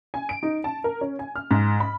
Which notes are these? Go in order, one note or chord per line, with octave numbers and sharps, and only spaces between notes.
G#5
D7
D#4
A5
A#4
C#4
G#5
F6
G#2
B5